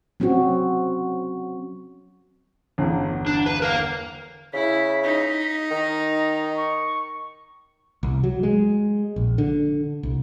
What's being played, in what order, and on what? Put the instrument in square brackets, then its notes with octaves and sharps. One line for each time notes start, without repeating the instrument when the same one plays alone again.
[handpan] F#3 C4 C#4 F#4
[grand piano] G1 E2
[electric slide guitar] D4
B4
A#4 F5
[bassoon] C#3 [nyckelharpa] E4 [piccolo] B6
[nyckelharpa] D#4
[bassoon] D#3 [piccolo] A#5
[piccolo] C#6
[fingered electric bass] C2
F#3
G#3
A#1
D3
C2